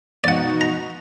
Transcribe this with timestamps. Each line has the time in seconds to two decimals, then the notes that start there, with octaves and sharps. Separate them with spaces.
0.24 B2 D#4 F#4 D5 F#5
0.61 A#5